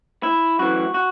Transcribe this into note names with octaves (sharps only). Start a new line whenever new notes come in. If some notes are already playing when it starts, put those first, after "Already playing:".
E4
F#2 E3 A3 F#4
F#4